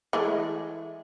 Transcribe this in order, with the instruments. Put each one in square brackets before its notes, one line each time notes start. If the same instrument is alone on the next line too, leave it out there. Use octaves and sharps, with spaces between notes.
[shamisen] E3 G#3 A3